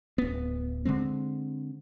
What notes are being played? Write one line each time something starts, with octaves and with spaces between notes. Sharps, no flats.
D1 B3
D3 F#3 G#3 C4